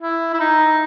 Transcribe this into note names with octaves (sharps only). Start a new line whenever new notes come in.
E4
E4
D#4